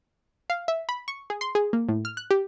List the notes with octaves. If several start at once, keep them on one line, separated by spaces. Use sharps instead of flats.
F5
E5
B5
C#6
G#4
C6
G#4
A#3
A2
F6
F#6
G4